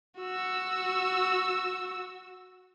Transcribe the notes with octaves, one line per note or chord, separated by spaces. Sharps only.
F#4 E6